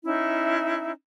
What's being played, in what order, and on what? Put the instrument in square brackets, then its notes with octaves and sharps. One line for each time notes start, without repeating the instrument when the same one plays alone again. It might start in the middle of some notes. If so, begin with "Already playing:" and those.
[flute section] C#4 D#4 E4 E5